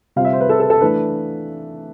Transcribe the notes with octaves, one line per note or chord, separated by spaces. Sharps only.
C3 G3 C4 F4 F5
E5
C5
B4
A4
A4
A4
E3 A3 D4 B4